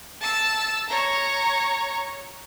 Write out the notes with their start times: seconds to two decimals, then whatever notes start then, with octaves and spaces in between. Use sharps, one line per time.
0.21 A5 E6
0.89 C#5 A#5